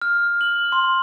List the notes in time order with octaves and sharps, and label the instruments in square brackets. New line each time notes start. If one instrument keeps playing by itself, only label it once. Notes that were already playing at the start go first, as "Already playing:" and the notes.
[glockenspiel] F6
F#7
C6